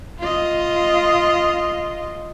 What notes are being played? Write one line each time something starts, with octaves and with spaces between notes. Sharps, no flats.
F4 D#5